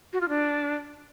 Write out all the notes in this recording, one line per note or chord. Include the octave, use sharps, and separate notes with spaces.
F#4
F4
D4